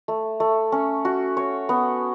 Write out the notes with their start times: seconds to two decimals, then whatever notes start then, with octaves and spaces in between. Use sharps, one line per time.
0.08 A3
0.40 A3
0.72 C#4
1.05 F#4
1.37 C#5
1.69 B3